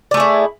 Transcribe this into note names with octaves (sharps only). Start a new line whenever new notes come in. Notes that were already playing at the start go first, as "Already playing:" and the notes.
A3 E4 G#4 D5